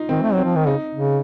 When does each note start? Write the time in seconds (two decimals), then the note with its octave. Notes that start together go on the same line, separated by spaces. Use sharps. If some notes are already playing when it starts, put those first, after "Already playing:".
Already playing: D#4 F4
0.09 D#3 C4
0.22 A3
0.33 F#3
0.38 C4
0.44 F3
0.56 D#3
0.66 C#3 D#4
0.95 C#3